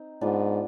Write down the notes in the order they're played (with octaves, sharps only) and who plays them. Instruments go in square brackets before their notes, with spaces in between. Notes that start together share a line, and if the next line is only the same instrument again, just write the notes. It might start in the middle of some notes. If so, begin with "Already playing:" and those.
Already playing: [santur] C4 D#4
[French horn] G#2 [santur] B3 D4 F4